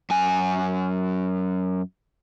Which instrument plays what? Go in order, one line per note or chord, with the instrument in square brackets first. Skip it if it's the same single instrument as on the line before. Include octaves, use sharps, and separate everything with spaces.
[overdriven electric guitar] F#2 G#5